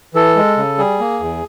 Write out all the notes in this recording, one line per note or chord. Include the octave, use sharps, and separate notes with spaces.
E3 A4
G#3
C#3
G3 G#4
A#3
E2